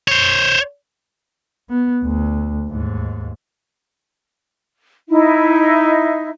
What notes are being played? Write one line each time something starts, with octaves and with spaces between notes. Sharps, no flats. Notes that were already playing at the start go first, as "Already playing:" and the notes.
C5 C#5
B3
D2
D#2 G#2
D#4 E4 E5